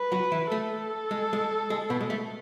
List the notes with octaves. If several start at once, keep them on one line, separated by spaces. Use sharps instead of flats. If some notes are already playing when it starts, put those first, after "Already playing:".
Already playing: B4
F#3 F#4
E3 E4
A3 A4
G#3
G#3
G#3
B2 B3
G#3
A3